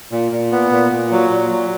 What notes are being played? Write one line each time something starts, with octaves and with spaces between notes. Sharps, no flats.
A#2
A#2
B3
A#2
A#2
F#3
A#2
F#3